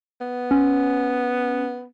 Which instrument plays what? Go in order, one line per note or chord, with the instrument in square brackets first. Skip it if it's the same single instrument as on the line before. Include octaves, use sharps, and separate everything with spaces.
[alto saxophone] B3
[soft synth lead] C#4